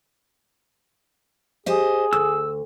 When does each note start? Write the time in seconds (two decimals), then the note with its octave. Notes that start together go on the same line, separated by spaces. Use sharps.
1.66 G4 G#4 C5 D#5
2.13 D2 E6